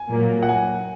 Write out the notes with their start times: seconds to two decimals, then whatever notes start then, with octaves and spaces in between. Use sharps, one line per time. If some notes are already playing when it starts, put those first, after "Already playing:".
Already playing: G#5
0.09 A#2 F#3 A#3
0.43 F#5
0.49 G#5